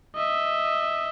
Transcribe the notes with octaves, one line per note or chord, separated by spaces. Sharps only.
D#5 E5